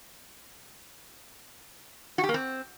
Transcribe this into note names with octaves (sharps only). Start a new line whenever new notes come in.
F#4
G4
A#3
C4